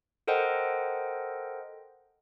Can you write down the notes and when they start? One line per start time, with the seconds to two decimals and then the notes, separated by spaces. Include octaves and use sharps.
0.27 A4 A#4 C5 D#5 F#5 G5